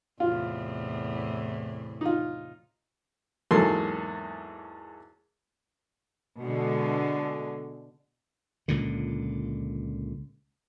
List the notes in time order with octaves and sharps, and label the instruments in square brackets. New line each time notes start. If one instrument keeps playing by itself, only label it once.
[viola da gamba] E2 A2 C3 [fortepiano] F4
[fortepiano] D#4 F4
E2 G#2 F#3 A#3 A4 C6
[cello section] B2 D3 G#3
[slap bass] C#2 A#2 D3